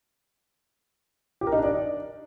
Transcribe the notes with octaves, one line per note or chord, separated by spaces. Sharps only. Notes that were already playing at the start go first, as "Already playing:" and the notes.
G4
A#4
D#4
D4
D5